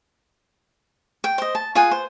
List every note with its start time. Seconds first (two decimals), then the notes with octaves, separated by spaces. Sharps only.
1.24 G5
1.38 C5 D#5
1.55 A5
1.75 F4 G#4 F#5 G#5
1.91 C5